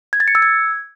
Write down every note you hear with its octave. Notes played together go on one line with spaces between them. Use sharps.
G#6
A6
C#7
E6
G#6